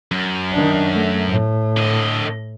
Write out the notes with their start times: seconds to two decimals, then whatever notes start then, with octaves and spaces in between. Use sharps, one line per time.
0.12 F#2
0.52 D#3 D4
0.93 A3
1.28 A2
1.77 D3 D#5